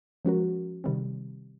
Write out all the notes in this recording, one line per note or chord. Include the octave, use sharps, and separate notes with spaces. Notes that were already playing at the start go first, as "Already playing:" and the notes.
F3 G#3 C#4 F#4 A#4
C3 D#3 G3 C4